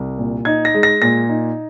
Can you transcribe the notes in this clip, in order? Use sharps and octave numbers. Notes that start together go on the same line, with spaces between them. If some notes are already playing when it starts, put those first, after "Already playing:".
Already playing: C2
A#2
D#4 G#6
A#6
G#3
A#6
A#2 A#6
D#4